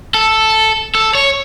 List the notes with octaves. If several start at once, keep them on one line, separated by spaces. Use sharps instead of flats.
A4
A4
C#5